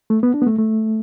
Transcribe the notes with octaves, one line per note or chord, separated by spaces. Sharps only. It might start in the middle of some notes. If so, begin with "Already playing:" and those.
A3
B3
D4
B3
A3
A3